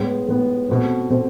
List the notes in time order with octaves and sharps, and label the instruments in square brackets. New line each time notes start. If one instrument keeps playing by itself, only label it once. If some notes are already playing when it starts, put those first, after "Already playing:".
Already playing: [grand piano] A2 G#3 B3
A2 G#3 B3
B2 A3 C4
B2 A3 C4